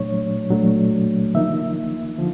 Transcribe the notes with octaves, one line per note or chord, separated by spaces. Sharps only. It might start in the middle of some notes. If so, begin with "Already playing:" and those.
Already playing: A#2 F#3 A3 D4 C#5
A#2 F#3 A3 D4
D3 F3 A#3 D#4 E5
D3 F3